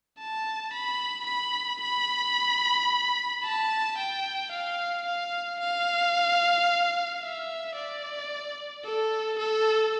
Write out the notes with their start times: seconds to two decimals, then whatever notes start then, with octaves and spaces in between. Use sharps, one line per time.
0.19 A5
0.73 B5
1.26 B5
1.81 B5
3.44 A5
3.97 G5
4.51 F5
5.05 F5
5.60 F5
7.22 E5
7.76 D5
8.84 A4
9.38 A4